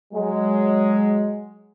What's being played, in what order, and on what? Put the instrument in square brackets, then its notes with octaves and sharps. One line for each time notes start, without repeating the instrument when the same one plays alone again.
[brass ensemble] F#3 G#3